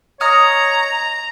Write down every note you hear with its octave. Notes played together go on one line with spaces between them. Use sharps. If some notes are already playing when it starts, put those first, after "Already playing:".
C#5 D#5 A#5 D#6 F6